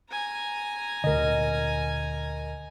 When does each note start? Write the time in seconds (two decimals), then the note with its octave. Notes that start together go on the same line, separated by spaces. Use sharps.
0.10 G#5 A#5
1.04 D2 A#2 D3 A#4 D#5